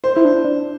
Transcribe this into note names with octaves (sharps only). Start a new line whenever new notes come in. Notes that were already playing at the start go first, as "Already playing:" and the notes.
C5
E4
D4
D4